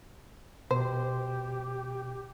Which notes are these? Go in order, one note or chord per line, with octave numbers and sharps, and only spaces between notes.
B2 G4 C5